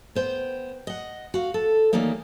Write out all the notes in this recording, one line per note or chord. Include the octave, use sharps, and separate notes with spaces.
B3 C5 G5
D#5 F#5
F#4 F5
A4
D#3 E3 F#3 G3 A#3 D#4